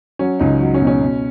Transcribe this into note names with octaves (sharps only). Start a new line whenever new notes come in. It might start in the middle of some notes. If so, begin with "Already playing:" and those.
F#3 C#4
C#2 D#4
F#3
C#4
B2
C#4
B2